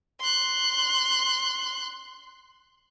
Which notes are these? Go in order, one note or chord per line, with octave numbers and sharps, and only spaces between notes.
C6 F#6